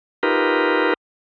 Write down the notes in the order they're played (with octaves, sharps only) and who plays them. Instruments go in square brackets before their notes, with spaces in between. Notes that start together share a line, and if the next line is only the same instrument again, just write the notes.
[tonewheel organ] D#4 F4 G4 A#4 B4